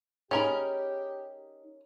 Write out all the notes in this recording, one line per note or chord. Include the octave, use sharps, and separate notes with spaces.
C#4 D#4 G4 G#4 A#4 B5